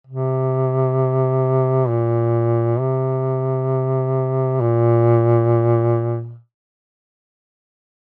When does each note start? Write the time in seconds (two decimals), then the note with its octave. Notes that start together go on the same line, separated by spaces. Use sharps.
0.07 C3
1.89 A#2
2.80 C3
4.61 A#2